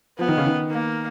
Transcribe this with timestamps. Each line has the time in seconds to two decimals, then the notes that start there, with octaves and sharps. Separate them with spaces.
0.19 F3 B3
0.28 D#3
0.37 C#3
0.46 D#3
0.70 A#3